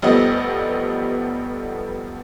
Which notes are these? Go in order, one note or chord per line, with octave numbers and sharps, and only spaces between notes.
F1 F3 G3 A3 B3 D#5